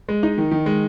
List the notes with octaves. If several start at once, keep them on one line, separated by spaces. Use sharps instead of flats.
G#3
D#4
D#3
D#3
G#3